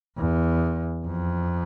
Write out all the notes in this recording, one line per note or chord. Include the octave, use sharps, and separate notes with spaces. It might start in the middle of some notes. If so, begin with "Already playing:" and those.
E2
F2